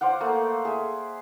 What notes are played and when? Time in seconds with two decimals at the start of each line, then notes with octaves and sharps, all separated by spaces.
0.01 C5 D5 F5 F#5
0.21 A3 A#3
0.65 G#4 E5